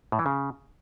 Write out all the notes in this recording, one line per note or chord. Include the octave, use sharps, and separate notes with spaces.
A2
E3
C#3